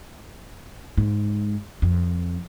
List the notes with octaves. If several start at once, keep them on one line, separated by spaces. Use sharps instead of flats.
G#2
F2